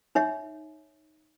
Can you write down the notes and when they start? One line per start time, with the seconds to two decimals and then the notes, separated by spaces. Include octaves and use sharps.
0.15 D#4 C#5 E5